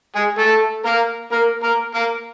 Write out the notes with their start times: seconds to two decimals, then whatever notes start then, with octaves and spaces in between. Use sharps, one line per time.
0.15 G#3 G#4
0.39 A3 A4
0.85 A#3 A#4
1.32 A#3 A#4
1.63 A#3 A#4
1.94 A#3 A#4